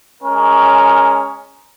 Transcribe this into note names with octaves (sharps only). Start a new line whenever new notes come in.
G#3 C#4 A#4